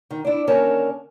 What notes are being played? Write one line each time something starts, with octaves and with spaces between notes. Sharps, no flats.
D#3
D4 E4
D#2 D3 C#4 A#4 C#5 A5